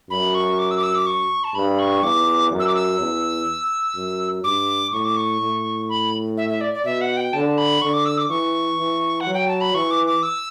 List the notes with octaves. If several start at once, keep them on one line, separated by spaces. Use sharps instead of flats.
F#2 B5
C#6
D6
E6
D6
E6
D6
C#6
A5
G2 B5
C#6
E2 D6
F#2
E6
D6
E6
E2
F#2
G2 D6
A2 C#6
D6
C#6
A2
B5
E5
E5
D5
D5
B2 E5
F#5
G5
D3 A5
B5
D3 C#6
D6
E6
D6
E3 C#6
E3
F#5
F#3
G5
A5
B5
E3 C#6
D6
D6
E6